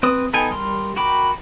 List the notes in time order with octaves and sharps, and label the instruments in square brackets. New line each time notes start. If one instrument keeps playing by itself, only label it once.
[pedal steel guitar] C4 B4 D#6
B3 D#4 A4 G5 G#5
G3 A#4 C6
F#4 A#4 G5 B5 D6